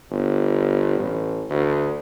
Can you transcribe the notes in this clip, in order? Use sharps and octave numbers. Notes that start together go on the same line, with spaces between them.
G1
A1
D2